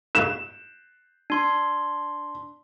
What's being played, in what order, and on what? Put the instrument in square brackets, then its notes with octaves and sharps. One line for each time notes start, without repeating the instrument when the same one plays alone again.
[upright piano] E7
[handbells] D4 C6